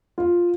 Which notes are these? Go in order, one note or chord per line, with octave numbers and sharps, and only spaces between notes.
F4